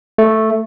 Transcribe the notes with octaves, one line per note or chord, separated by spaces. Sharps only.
A3